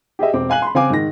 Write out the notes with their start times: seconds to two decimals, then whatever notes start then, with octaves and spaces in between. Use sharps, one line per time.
0.19 G4 G#4 D#5 E5
0.33 E1 C4 D6
0.50 F5 G#5 F#6 F#7
0.62 B5 C6
0.74 C#3 C4 F5 G#5 D6
0.90 G#2 D#3 A#6